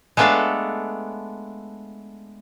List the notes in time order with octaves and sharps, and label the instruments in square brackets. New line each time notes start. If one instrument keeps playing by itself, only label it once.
[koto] G#3 A3 B3 D4 A4 F5